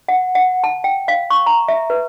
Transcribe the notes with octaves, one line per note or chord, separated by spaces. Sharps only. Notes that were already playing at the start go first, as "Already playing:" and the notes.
F#5
F#5
A5
G5
F5
C#6
A#5
E5
B4